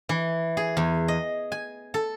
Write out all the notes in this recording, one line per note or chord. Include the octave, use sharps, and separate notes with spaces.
E3
G#4
E2
D#5
G#5
A4